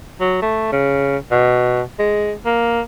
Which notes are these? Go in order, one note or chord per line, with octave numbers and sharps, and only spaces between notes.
F#3
A3
C#3
B2
G#3
A#3